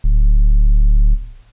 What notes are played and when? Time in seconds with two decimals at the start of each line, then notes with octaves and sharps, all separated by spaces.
0.04 D1